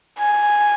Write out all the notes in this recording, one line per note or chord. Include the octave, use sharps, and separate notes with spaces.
G#5